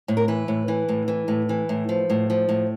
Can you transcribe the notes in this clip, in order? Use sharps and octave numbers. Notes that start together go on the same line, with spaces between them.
A2
A#4
E3 B4
A2
E3
A2
E3
A2
E3
A2
F3
A2
F3
A2